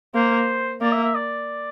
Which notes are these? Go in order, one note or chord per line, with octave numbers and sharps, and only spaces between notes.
A#3 C5
A#3 D5
E5
E5
D5